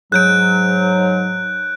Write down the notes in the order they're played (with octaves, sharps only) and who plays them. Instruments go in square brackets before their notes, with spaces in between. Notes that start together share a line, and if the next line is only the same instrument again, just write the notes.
[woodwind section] G#2 F#3 [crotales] F#6 G6 D7